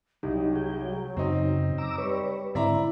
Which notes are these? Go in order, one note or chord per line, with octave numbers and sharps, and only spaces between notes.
C2 F#3 D#4 G4
G#4 G5
F#2 C#3 C4 D#4
A#5 D6 E6
G3 B4 C#5
G#2 D3 C4 E4 D5 E5 A#5